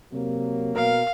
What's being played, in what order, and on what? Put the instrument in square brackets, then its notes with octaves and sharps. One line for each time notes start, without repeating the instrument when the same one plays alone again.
[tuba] C3 [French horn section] F#3 A#3
[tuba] B2 [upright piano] A#4 [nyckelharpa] F5